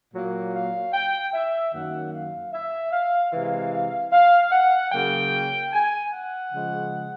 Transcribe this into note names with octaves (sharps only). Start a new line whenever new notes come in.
A#2 F#3 A#3
F5
G5
E5
F#2 D#3 F#3 A#3 F#5
F5
E5
F5
C3 E3 G#3 F5
F5
F#5
C#3 F#3 A#3 G5
G#5
F#5
C#3 F3 G#3